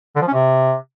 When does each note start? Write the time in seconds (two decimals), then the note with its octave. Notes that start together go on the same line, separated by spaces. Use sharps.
0.16 D3
0.21 F3
0.27 C#4
0.33 C3